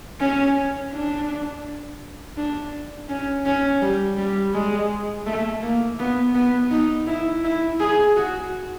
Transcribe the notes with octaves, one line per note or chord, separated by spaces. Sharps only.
C#4
D4
D4
C#4
C#4
G3
G3
G#3
A3
A#3
B3
B3
D#4
E4
E4
G#4
F#4